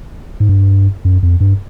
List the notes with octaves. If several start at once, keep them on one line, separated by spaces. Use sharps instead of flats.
G#2
G2
F#2
F2
G2